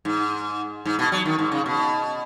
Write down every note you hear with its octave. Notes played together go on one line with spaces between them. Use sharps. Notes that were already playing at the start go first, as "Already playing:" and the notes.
G#2
G#2
B2
F#3
D#3
G#2
C#3
B2